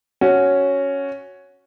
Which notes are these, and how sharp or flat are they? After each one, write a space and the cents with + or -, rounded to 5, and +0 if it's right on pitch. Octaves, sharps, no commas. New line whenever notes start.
C#4 +0 F#4 +0